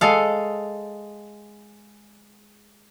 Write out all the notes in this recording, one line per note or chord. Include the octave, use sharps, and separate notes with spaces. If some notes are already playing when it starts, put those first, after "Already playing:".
G#3 A4 F5